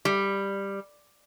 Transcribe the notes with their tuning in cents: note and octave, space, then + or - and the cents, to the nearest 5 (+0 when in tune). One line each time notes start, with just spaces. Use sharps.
G3 +10